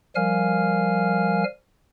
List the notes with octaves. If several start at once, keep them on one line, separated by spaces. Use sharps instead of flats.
F3 G3 A#4 F5 G#5 F6